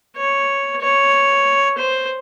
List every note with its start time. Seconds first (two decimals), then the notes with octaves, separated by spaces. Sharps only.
0.17 C#5
0.81 C#5
1.78 C5